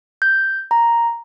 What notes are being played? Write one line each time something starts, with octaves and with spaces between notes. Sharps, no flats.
G6
A#5